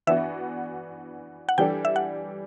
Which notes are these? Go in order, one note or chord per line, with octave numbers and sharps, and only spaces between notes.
E3 B3 D4 F#4 E5
F#5
E3 G3 D4 A4 G5
E5
F#5